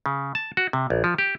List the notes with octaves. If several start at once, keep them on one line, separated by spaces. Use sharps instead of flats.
C#3
A5
F#4
C3
A#1
F3
G4